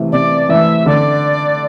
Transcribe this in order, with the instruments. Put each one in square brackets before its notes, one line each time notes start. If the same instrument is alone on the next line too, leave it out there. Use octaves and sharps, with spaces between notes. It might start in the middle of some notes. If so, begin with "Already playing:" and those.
Already playing: [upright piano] C3 E3 A3
[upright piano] C3 [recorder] D5
[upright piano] E3 A3 [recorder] E5
[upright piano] D3 [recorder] D5